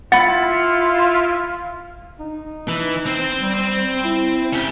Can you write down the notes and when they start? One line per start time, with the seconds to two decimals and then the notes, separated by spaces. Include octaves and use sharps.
0.12 E4 F4 F#5 B5 A6 C#7
2.20 D#4
2.68 E3
3.06 C4 C5
3.41 G3
4.05 E4
4.53 C#3 G4